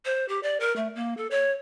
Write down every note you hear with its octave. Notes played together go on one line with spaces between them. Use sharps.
C5
G4
D5
A#4
A3
A#3
A4
C#5